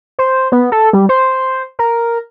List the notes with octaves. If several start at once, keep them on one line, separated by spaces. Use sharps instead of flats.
C5
B3
A4
G3
C5
A#4